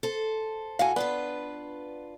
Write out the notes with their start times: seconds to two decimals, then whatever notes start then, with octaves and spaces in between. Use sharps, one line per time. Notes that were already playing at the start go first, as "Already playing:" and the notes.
0.03 A4 C5
0.79 A2 F#4 A4 F5 G#5
0.96 B3 D4 F4 B4